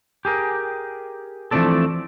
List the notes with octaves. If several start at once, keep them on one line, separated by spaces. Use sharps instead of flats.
G4 G#4 A#4
E3 F3 A3 C4 D4 A4